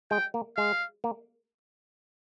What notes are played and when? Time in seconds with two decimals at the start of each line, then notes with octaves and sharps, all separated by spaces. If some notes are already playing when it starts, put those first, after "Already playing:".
0.11 G#3 G5
0.34 A#3
0.57 G#3 F5
1.04 A#3